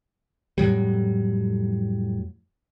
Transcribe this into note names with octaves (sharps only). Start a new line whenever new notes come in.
F2 A2 F#3 G3